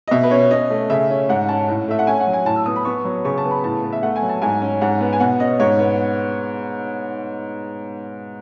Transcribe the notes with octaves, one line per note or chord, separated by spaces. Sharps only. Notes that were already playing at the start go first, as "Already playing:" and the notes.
D#5
B2 E5
B4
C#4 C#5
C#4 D#5
A3
C#3 E5
C#4
G#2 F#5
C#4 A5
A2
A3 E5
F#5
C#4 G#5
F#5
F#3
G#5
A2 A5
E6
B3 D#6
B5
B3 C#6
F#3
C#3 C#6
A5
B3
B5
A2 A5
B3
E5
A3 F#5
G#5
F#3
A5
G#2 G#5
C#4
G#2 F#5
B3
G#5
B2 F#5
C#4 D#5
G#2 C#5
B3